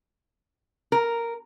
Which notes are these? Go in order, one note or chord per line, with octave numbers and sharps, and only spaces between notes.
A#4